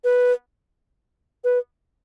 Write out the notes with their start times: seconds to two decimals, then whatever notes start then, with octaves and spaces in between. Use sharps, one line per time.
0.04 B4
1.44 B4